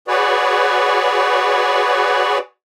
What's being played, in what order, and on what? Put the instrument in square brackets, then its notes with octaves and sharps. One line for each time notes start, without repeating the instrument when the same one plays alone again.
[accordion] F#4 G#4 B4 C#5 D5